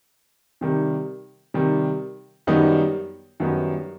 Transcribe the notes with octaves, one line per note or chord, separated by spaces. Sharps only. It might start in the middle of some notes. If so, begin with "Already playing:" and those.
C3 D#3 G3
C3 D#3 G3
F#2 D#3 G3 B3 D#4
F#2 D#3 G3 B3 D#4